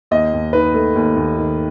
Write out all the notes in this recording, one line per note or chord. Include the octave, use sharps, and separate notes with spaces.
D#2 D#5
D#2
D#3 B4
A3
D#2
D#2
D#3